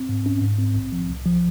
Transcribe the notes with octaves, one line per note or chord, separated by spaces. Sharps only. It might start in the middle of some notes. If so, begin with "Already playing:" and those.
Already playing: C4
G#2
C#4
G#2
C4
A#1
F3
C2
F3